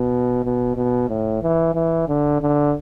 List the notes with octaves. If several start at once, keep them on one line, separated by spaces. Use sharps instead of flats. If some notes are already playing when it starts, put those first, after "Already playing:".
Already playing: B2
B2
B2
A2
E3
E3
D3
D3